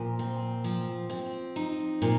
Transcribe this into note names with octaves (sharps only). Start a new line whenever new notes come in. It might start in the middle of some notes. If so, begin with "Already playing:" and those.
Already playing: A#2 F3
C4
F3
C4
D#4
A#2